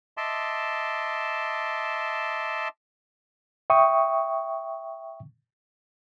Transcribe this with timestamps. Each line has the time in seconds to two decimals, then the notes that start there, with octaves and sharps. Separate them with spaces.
0.17 D#5 E5 A5 C6 D6
3.70 E5 G5 C#6 D#6